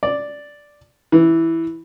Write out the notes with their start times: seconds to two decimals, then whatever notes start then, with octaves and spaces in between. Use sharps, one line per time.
0.03 D5
1.12 E3